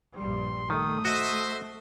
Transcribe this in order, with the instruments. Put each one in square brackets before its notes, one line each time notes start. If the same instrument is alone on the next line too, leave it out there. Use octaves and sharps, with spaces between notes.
[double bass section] A#1 G2 G3 [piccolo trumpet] C6
[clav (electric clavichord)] D#3 [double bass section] A3 [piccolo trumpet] D#6
[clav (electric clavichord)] F#4 D#5 [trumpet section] C5 E5